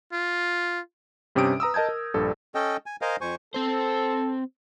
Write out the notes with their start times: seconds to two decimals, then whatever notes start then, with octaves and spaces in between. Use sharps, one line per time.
0.13 F4
1.35 G2 C3 C#4 G4 D#6 D7
1.60 B4 A#5 D#6 E6
1.74 A#4 D#5 A5 G6 G#6
1.89 A#4
2.14 A#1 G2 A4
2.55 C#4 A4 D#5 G5
2.86 G#5
3.02 A#4 C5 D#5 F5 G#5
3.21 F2 C5 G#5 C#6
3.54 C4 A4 C5